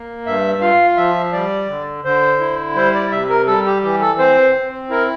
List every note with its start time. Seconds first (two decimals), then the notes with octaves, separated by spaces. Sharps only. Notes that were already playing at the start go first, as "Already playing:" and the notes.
Already playing: A#3
0.26 G2 E5
0.61 F4 F5
0.97 F3 E5
1.32 G3 D5
1.68 D3
2.04 D3 C5
2.40 E4
2.75 G3 C5
2.94 D5
3.11 C3 E5
3.29 A#4
3.47 G3 A4
3.66 G4
3.83 E3 G4
4.01 A4
4.19 C4 C5
4.55 C4
4.90 E4 A#4